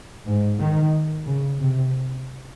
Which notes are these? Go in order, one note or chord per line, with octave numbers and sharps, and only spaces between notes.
G#2
D#3
C#3
C3